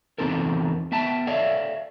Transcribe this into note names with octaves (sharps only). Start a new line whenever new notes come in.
E2 F3 C4 D#4 A4 A#4
B3 E5 G5 A5
A4 C#5 D5 E5 F5